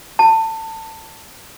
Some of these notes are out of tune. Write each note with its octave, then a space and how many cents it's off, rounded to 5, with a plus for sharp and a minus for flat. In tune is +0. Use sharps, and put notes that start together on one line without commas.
A5 +25